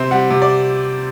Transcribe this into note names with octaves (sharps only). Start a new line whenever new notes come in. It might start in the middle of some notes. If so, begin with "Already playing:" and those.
Already playing: C3 C4
G3 F#5
C3
D5